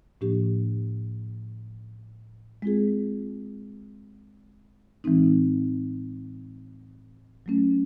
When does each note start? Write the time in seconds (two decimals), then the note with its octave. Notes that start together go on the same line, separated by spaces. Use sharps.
0.21 A2 F3 A#3 D4 G4
2.62 G#3 C4 F4 G#4
5.04 A2 E3 G#3 C4 D#4
7.46 F#3 A3 C#4